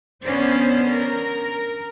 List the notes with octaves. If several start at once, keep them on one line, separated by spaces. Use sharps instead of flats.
D3 B3 C#4 D4 C5
A#4